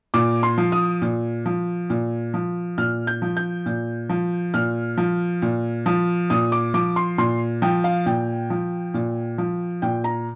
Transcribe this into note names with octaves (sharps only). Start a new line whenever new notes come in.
A#2 D6
C6
F3
D#6
A#2
F3
A#2
F3
A#2 F6
G6
F3
G6
A#2
F3
A#2 F6
F3
A#2
F3
A#2 D#6
D6
F3 D6
C6
A#2 C6
F3 G5
F5
A#2 G5
F3
A#2
F3
A#2 G5
A#5